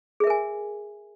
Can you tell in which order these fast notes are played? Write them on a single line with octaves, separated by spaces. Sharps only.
G#4 E5 A#4 G#5